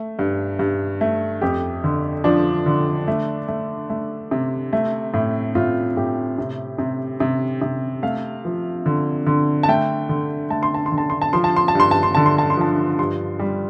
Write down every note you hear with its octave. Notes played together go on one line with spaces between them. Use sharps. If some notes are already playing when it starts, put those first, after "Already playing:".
Already playing: A3
G2
G2
A3
F2 G4
D3
F3 D4
D3
A3
A3
A3
C3
A3
A2
A2 F4
A2 G4
C3
C3
C3
C3
A3 F5
F3
D3
D3
A5
A3 G5
D3
A3 A5
C6
A5
C6
D3
A5
C6
A5
F3 C6
A5
C6
A5
G2 C6
A5
C6
D3 A5
C6
A5
C6
F3 A5
G2 C6
G3